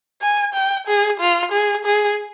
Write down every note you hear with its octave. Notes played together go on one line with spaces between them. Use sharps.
G#5
G5
G#4
F4
G#4
G#4